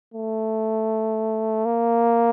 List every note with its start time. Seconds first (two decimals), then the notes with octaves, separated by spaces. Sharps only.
0.14 A3
1.65 A#3